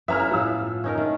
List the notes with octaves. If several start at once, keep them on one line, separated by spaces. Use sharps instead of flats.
B3 C#4 E4 E5 A#5 F6
A2 F3 F4 F#5 E6
C#4 D#4 A#4
D#3 A3